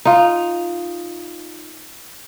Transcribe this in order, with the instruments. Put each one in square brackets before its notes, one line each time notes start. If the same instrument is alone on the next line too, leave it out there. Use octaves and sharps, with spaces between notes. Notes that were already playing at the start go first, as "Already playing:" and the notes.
[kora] D#4 F4